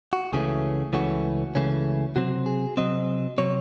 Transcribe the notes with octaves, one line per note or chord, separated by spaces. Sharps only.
F#4
C#2 C#3 E3 A3 C#4 G#4
C#2 C#3 E3 A3 C#4 F#4
C#2 C#3 E3 A3 C#4
C3 F#3 C4 F#4
G#4
C3 F#3 C4 D#5
C3 F#3 C4 C#5